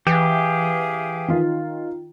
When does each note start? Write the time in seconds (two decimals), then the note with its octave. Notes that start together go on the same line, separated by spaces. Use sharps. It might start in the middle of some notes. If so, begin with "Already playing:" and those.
0.07 E3 G4 G#4 E5 F5 G6
1.28 D#3 F4